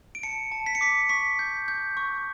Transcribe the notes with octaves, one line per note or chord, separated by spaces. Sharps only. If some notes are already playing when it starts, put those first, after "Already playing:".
D7
A5 C#7
A5
B6
C#7
D6 B6
C#6 B6
G6
G6
C#6